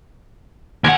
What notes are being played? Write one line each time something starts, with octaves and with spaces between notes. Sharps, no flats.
D#2 F#5 G#5